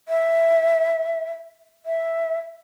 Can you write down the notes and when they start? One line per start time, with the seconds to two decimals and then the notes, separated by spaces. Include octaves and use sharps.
0.08 E5
1.86 E5